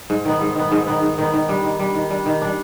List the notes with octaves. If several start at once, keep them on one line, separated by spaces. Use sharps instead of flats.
G#2
D#3 B3
G#2
D#3 B3
G#2
D#3 B3
G#2
D#3 B3
D#3
G3 D4
D#3
G3 D4
D#3
G3 D4
D#3
G3 D4